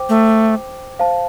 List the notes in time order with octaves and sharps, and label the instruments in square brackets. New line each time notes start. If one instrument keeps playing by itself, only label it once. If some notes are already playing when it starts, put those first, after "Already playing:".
Already playing: [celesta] C5 G5 D6
[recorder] A3
[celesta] C5 F5 A5